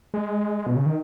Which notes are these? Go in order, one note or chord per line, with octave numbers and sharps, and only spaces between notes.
G#3
B2
C#3
D#3